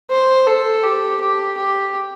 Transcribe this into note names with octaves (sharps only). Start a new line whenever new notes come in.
C5
A4
G4
G4
G4